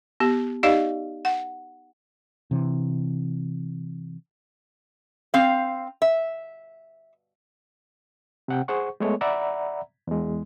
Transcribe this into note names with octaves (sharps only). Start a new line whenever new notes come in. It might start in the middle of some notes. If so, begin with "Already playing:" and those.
B3 G4
D#4 G4 D5 D#5 F5
F#5
C3 E3
C4 F5
E5
C3 F#5 G5
G#4 C5 F#5 C#6
G#3 A3 B3 C#5
D5 E5 F#5 A#5 B5
E2 G#3